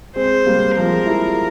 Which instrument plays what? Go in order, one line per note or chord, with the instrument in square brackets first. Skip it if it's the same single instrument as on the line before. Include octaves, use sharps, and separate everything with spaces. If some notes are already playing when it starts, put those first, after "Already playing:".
[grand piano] G#3 C4 [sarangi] C5
[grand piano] G3 A#3
[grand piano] F3 G#3 [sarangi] A#4
[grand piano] E4 G4